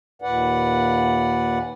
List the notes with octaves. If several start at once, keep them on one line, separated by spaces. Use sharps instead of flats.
D#2 A#2 B4 D5 F#5